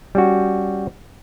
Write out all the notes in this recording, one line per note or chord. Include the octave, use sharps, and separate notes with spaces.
G3 C#4 F#4